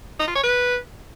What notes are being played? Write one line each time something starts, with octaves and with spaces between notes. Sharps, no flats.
D#4
F4
C#5
B4